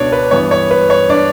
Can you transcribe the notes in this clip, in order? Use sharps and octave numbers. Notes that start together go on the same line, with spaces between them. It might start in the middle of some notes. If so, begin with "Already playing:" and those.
Already playing: C#2 B2 B3 D4 C#5 D5
B4
G2 E3 B3 C#5
C#5
B4
C#5
D4 D5